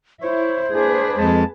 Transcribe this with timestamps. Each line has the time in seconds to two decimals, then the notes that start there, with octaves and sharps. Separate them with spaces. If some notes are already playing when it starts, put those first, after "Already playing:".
0.22 E4 C5 C#5
0.72 A#3 D4 G#4 B4
1.17 F2 G#3 A5